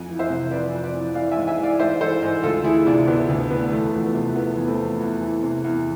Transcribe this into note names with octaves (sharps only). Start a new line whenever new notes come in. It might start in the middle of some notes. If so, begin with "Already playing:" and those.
Already playing: F2 G#5
E3
C5 E5
C3
F2 B4 D5
F2
B4 D5
E3
E3 D5 F5
E5 G#5
G#2
E5 G#5
E3
D5 F5
G#2 C5 E5
E3 A4 C5
G#2
D2 F4 A4
E3 E4 G#4
C3 D4 F4
D2 B3 D4
D2
E3 B3
E2 A3
F3
B3
C3
E2 B3
E2
A3 C4
F3
E2
E3
C3
E2